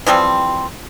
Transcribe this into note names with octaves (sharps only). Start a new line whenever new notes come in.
E3 F3 G3 C4